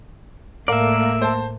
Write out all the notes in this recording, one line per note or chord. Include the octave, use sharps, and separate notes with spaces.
A2 A3 A#3 A#4 D5 E5 F5
C5 A5